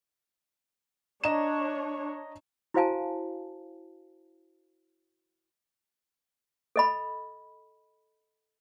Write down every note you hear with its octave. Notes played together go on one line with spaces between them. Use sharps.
D4 C#5 D#5 A#5 E7
E4 F#4 C5 F5 G#5 A5
A4 D#5 B5